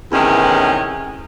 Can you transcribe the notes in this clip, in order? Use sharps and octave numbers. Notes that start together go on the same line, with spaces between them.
E2 A2 C3 D#3 E3 C#4